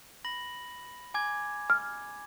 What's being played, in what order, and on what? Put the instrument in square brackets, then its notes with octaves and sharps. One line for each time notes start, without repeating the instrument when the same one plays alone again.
[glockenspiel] B5 A#6 F#7
G#5 D6 G#6
[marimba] F6